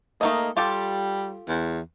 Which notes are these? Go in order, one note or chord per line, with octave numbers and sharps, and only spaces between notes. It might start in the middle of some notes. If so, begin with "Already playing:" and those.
A3 A#3 D#4 D#5
G3 F4 G4 A4
E2